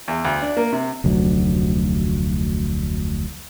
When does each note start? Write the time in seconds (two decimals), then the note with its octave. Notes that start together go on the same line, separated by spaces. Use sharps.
0.08 E2
0.25 D2
0.42 D4
0.57 A#3
0.73 C3
1.04 F1 D2 F#3